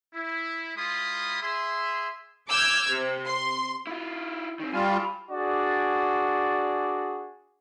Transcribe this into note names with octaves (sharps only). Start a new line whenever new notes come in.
E4
G#3 E4 F4 B5 C6 D#6
G#4 E5 C6
D6 E6 F6 G6 G#6
C3
C6
E4 F4
D#3 C4
G3 F4 G#5 B5
D4 F#4 G#4 D5